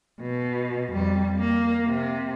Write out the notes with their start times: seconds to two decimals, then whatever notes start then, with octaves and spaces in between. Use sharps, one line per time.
0.21 B2
0.93 F2 G3
1.39 A#3
1.86 C3